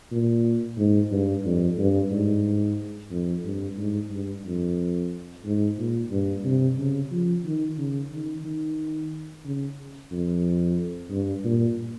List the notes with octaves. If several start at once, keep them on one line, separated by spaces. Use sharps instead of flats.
A#2
G#2
G2
F2
G2
G#2
F2
G2
G#2
G2
F2
G#2
A#2
G2
C3
C#3
F3
D#3
C#3
D#3
D#3
C#3
F2
G2
A#2